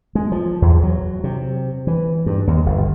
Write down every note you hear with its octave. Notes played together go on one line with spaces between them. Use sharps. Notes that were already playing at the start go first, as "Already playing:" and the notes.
G#3
F3
E2
F#3
C3
E3
G2
D#2
G1